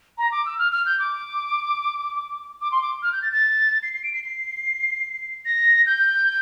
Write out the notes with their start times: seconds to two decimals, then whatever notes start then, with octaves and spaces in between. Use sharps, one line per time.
0.18 A#5
0.32 D6
0.46 E6
0.59 F6
0.72 F6
0.86 G6
0.99 D6
2.61 D6
2.72 C6
2.82 D6
3.03 F6
3.12 G6
3.22 A6
3.33 A6
3.83 C7
3.93 C7
4.03 D7
4.13 C7
4.24 C7
5.45 A#6
5.86 G6